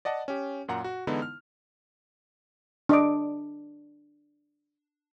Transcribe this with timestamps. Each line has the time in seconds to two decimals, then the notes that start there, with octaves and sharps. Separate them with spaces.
0.05 D5 D#5 F#5 A5
0.28 C#4 G4
0.68 F#2 A#2 F#5 A#5
0.84 F#4
1.07 D3 E3 G#3 B3 D#4 E4
1.22 F6
2.89 D4 D#5 D6